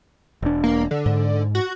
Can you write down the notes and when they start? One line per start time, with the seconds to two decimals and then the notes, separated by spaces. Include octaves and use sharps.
0.42 E1 D4
0.64 A#3
0.91 D3
1.06 G#2
1.55 F#4